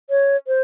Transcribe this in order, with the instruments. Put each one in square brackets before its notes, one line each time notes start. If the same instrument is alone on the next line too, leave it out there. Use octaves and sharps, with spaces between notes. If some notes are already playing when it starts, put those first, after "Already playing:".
[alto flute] C#5
C5